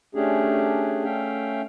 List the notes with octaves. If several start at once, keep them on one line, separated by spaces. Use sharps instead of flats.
A3 C#4 D4 G4 G#4
A3 C#4 E5 F5 G5